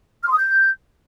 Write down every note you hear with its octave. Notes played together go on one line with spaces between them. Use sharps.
F6
C6
D#6
G6